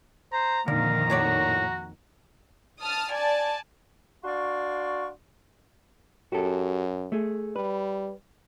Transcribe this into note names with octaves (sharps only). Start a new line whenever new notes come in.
C5 A#5
F2 A#2 D3 D#3 F5 A#5
A2 F#4 C#5 D5
A5 D#6 F6
D5 G#5 A5
D4 F#4 D5 F5 C6 C#6
F#2 F#4 G4 A4
A3 G#4
G3 B4